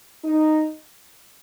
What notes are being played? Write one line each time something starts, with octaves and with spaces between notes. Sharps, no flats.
D#4